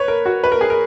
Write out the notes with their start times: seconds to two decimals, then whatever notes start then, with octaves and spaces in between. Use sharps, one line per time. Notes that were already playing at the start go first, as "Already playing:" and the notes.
Already playing: B4 C#5
0.08 A#4
0.26 F#4
0.44 B4
0.52 A#4
0.61 G#4
0.70 A#4